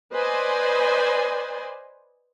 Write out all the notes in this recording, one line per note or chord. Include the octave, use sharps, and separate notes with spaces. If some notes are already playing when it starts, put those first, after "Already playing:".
B4 C5 D5 D#5 G#5